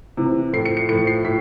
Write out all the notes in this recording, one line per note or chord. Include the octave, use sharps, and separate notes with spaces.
C3 E3
A2 F3 C7
C#7
C#7
A2 F3 C#7
C7
A2 B6